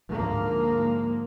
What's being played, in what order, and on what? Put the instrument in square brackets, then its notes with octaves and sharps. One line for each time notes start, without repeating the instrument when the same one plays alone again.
[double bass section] D2 G#2 F3 A#3